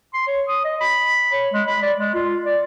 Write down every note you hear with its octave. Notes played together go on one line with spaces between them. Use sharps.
C6
C#5
D#6
D#5
B5
C#5
G#3
B5
D5
G#3
F4
D5